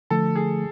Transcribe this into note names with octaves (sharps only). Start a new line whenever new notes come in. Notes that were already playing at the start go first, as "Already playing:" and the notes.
D3 F3 A3 A4
G#4